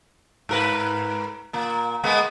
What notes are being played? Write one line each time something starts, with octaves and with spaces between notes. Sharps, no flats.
G#2 A#4 B4
A#2 A#3
G#3 A#3 B3